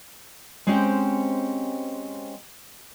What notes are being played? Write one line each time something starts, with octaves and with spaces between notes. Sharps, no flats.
G#3 C4 C#4 G4 C5 G5